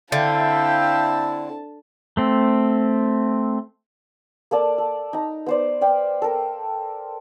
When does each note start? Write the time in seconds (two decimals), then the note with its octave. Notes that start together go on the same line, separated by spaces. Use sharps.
0.12 D3 C4 E4 E5 F5 G5 A5
2.17 A3 C4
4.51 A#3 A4 D5 A5
4.78 A4
5.13 D#4 A#5
5.46 B3 C5 D5
5.81 D5 F5 G5
6.22 A4 A#4